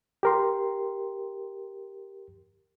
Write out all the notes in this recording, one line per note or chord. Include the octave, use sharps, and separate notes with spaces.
G4 A#4 C6